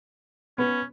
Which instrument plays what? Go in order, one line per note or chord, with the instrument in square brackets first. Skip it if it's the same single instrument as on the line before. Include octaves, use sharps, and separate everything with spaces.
[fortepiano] B3 [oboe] C#4